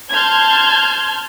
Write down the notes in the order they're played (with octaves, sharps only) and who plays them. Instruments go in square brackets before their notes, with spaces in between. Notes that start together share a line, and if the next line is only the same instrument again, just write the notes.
[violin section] A5 C6 F6 G6 G#6